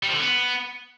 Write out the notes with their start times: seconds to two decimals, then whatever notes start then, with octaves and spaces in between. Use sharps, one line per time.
0.03 G3
0.09 F3
0.15 D3
0.20 B3